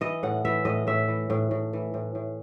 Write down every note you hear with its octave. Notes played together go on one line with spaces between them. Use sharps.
E3 D#5
A2 F#5
E3 E5
A2 D#5
A2 E5
E3
A2
A2
E3
A2
A2